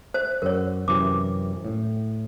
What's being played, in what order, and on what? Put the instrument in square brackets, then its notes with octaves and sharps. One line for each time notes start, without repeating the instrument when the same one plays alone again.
[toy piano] C5 [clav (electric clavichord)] E5
[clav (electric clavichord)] F#2 F#5 [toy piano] A#4 C#5
[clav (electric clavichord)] F#2 C3 E3 [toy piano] D6
[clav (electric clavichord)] A2